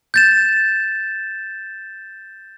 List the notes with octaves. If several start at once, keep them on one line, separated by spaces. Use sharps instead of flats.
G6 A6 E7